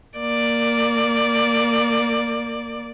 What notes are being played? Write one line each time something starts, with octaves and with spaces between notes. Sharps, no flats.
A#3 D5